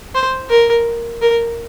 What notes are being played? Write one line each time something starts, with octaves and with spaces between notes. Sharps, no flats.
C5
A#4
A#4